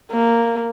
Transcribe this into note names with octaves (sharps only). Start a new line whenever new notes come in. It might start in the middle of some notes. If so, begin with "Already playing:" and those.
A#3